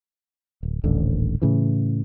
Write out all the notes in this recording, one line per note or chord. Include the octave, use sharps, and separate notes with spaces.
D1
D#1 A1 D3
A2 C#3 E3